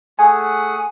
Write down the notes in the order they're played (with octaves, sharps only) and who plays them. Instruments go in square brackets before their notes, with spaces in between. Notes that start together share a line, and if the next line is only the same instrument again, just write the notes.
[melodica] A3 G#4 F#5 [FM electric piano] G#5